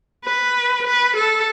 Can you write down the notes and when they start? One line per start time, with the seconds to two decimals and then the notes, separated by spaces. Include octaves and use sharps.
0.25 B4
0.87 B4
1.17 A4